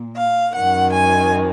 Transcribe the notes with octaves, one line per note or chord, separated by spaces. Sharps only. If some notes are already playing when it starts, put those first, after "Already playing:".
Already playing: A#2
F5
F#2 D#3 F#5
G#5